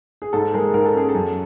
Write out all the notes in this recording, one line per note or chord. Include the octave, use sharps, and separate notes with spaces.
G#4
G#2 A4
G#3 G#4 A#4
G#2 A#4
A4
C#4 G#4
A4
F#2